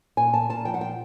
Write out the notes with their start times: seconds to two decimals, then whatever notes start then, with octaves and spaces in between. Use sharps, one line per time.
0.17 A#2 G#5
0.33 A#3 A5
0.49 A#2 A5
0.65 F3 G5
0.74 F#5
0.81 G5